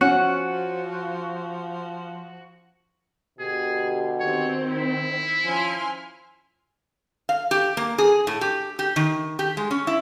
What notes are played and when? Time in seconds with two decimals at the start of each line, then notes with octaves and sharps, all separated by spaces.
0.01 F3 C#4 F#4 F#5
3.39 B2 D3 G4 G#4
4.20 D#3 C4 C#5
4.72 E4
5.44 F3 C#4 G#5 C6 F6
7.29 F5
7.51 G4
7.77 A#3
7.98 G#4
8.27 A2
8.41 G4
8.79 G4
8.96 D#3
9.39 G4
9.57 G#3
9.71 C#4
9.87 E4